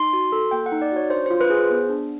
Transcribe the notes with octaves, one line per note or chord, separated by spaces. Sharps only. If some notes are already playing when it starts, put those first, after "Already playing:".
Already playing: D#4 C6
F#4
A4
A#3 G5
F#5
D#4
D5
F#4 C#5
D4 C5
F4 C5
B4
G#4 C5
B3
D4